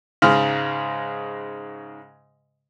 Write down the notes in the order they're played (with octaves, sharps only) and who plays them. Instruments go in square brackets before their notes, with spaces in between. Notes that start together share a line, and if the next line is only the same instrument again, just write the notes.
[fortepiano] G#2 C#3 G#3 F6